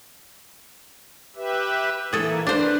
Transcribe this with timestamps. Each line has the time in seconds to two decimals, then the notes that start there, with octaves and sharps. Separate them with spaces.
1.36 G4 B4 E5
2.13 E3 A#3 E4 G#4 A4
2.47 D4 B4 C5